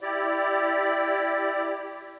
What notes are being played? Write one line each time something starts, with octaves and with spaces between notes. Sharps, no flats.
E4 G4 D5